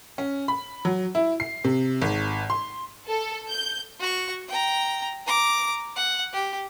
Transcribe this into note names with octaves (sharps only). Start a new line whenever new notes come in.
C#4
B5
F#3
E4
C7
C3
G#1
C6
A4
G6
F#4 C#6
G5 A#5
A#5 D6
F#5
G4